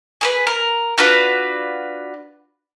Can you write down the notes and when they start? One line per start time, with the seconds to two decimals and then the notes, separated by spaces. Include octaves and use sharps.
0.21 G#4 A#4 B4
0.47 A#4
0.98 D4 F4 F#4 B4